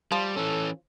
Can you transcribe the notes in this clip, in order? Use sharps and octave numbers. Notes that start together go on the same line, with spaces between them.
F3 G3
E3 C#4 A4